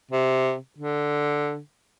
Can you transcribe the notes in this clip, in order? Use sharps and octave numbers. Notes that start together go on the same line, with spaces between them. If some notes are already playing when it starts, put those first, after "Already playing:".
C3
D3